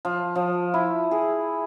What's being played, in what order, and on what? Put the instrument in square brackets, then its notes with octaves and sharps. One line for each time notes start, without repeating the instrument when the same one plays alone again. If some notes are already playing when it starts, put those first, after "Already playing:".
[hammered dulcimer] F3
F3
E4
G#4